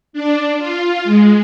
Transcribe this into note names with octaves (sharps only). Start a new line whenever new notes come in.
D4
F4
G#3